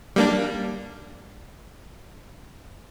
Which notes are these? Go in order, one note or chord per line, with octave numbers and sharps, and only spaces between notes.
G3 A#3 D4